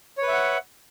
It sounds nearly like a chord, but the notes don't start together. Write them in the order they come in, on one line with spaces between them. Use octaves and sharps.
C#5 B4 E5 F#5